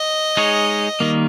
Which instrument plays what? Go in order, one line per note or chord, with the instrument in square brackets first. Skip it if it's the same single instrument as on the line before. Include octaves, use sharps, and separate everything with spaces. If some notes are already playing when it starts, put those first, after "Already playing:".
Already playing: [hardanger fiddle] D#5
[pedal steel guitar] G#3 D#4 G#4 C#5
D#3 G3 A#3